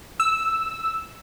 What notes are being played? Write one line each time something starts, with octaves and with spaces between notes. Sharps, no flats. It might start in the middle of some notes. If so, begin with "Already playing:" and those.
E6